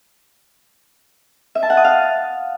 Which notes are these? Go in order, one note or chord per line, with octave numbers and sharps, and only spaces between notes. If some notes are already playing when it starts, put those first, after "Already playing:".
E5
A5
F#5
D#6
F5